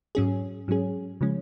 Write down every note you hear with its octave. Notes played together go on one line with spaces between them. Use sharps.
G#2 F#3 C#4 G#4
G#2 F#3 C#4 G#4
C#3 F3 G#3 C#4